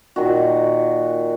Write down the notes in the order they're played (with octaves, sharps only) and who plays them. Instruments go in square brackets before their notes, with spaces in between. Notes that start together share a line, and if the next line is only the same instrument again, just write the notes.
[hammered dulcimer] A#2 D#3 F#4